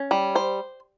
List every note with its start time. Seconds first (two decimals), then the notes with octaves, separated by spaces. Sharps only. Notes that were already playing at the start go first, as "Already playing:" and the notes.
Already playing: C#4
0.11 G3
0.35 C5